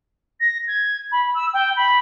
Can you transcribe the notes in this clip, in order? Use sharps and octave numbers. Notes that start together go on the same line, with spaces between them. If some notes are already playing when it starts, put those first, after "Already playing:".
A#6
G#6
B5
E6
G5
B5